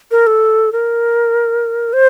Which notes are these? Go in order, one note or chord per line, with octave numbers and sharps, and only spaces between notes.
A#4
A4
A#4
C5